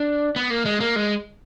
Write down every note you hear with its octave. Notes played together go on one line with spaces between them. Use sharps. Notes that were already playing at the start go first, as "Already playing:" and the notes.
Already playing: D4
B3
A#3
G#3
A#3
G#3